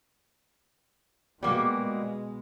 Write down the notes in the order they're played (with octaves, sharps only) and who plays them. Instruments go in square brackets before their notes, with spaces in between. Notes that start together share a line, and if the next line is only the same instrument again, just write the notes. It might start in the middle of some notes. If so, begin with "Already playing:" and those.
[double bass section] B2 G#3 [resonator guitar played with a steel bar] G3 A#3 F#4